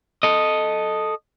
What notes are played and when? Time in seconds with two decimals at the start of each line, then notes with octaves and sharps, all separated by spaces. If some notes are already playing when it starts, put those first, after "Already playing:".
0.23 A4 D#5